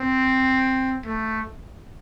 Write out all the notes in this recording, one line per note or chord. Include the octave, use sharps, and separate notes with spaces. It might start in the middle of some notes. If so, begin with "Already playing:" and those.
Already playing: C4
A3